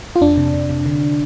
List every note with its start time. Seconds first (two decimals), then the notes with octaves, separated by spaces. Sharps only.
0.16 F4
0.21 F2 D4
0.37 C3
0.54 C3
0.70 C3
0.86 D3